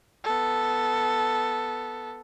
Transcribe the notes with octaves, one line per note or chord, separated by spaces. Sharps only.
B3 A4